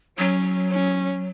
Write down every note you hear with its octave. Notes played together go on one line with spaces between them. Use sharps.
F#3 C#4
C#4